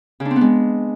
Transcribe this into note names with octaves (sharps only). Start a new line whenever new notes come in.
C#3
D4
C4
B3
G#3